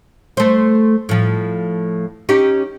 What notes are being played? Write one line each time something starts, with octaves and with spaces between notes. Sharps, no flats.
A3 C5
A2 F3
C#4 D#4 G4